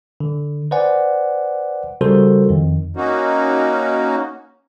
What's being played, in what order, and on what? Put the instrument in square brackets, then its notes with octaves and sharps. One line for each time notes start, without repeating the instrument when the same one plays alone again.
[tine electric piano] D3
B4 C5 D5 F#5 G#5
C#3 G3 F#4 A4 A#4 C5
F2 D#3
[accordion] A#3 C#4 D#4 F#4